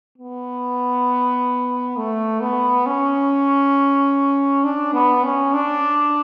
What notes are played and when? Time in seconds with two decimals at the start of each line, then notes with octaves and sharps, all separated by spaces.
0.18 B3
1.97 A3
2.41 B3
2.86 C#4
4.64 D4
4.94 B3
5.24 C#4
5.54 D4